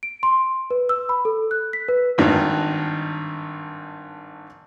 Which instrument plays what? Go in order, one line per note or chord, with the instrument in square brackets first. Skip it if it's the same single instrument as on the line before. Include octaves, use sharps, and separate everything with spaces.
[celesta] D7
C6
B4
E6
B5
A4
F#6
B6
B4
[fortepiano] G#1 G2 D#3